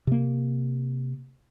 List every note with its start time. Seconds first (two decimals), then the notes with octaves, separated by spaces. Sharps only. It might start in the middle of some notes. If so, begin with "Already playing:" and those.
0.07 C3 A#3